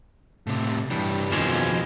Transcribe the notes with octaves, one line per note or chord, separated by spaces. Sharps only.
A2 C3
G2 E3 G3
F2 B2 D#3 F3 G#3